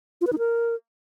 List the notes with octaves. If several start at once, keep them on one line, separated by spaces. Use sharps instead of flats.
F4
B4
D#4
A#4